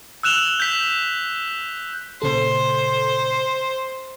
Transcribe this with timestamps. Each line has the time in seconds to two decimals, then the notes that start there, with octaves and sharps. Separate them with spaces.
0.23 E6 F#6 E7 F7 G7
0.60 G6 B6
2.22 A#2 C#3 A4 C5